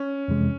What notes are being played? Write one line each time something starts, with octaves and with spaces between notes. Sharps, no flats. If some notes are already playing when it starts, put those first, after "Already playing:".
Already playing: C#4
F2 C3 E3 G#3